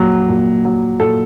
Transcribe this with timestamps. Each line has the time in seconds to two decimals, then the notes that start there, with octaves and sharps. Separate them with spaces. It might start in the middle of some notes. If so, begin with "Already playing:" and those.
Already playing: A#2 F#3
0.29 A#2
0.65 F#3
1.00 A#2 A4